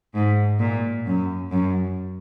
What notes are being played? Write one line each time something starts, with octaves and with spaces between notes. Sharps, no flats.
G#2
A#2
F#2
F#2